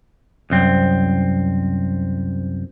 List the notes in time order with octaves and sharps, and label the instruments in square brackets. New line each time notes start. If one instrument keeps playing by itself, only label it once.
[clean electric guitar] C2 F#2 C4